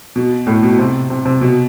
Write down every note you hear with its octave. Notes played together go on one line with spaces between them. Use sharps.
B2
A2
B2
C3
C3
C3
B2